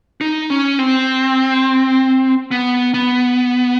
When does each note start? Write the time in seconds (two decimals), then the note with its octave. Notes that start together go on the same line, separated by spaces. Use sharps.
0.21 D#4
0.50 C#4
0.79 C4
2.51 B3
2.94 B3